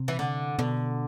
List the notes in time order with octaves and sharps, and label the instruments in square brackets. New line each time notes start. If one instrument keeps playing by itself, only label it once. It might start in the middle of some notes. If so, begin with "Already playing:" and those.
Already playing: [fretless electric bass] C3
[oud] E3
D3
[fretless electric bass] B2 [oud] D3